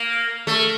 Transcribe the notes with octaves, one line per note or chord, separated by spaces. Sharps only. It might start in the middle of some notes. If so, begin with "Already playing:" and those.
Already playing: A#3
A3